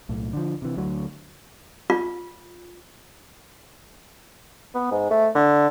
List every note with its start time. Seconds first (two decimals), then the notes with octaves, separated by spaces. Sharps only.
0.09 B1 A2
0.33 D3 F3
0.62 C3 E3
0.77 D2 F#3
1.90 F4
4.75 B3
4.91 G#2
5.11 A3
5.35 D3